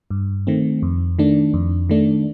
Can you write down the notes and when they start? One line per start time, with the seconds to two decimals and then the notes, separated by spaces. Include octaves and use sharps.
0.11 G2
0.47 D#3 A3 C4
0.82 F2
1.19 D#3 A3 D4
1.54 F2
1.89 D#3 A3 D4